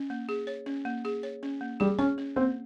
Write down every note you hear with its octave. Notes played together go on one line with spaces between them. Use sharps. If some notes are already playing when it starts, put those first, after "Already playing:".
Already playing: C#4
A#3
G#4
C#5
C#4
A#3
G#4
C#5
C#4
A#3
G3 G#4
C#4 C#5
C#4
A#3 C4